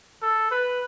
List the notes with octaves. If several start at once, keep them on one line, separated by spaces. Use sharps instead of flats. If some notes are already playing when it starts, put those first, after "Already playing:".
A4
B4